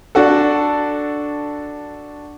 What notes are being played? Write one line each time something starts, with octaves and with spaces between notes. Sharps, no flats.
D4 F#4 A4